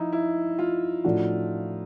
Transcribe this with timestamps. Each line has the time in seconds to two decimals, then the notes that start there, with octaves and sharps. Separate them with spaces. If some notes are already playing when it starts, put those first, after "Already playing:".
Already playing: F3 D#4 E4
0.13 E4
0.59 F4
1.04 A2 F3 A3 D4 F#4